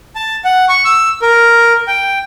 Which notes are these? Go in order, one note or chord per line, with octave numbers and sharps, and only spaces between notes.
A5
F#5
C#6
E6
A#4
G5